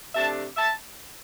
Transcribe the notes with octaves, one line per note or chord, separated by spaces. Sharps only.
C3 A3 D4 E5 A5
E5 A5